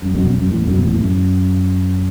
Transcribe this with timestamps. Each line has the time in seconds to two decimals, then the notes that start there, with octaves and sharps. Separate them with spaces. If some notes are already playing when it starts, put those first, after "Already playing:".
0.02 F#2
0.15 F#2 B2
0.27 F#2
0.39 F#2
0.50 E2 A2
0.67 F#2 B2
0.82 E2 A2
0.92 E2
1.00 F#2